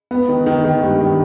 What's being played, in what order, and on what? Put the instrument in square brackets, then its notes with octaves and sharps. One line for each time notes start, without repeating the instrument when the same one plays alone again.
[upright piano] B3
D#3
D#3
D#3
G2
D#3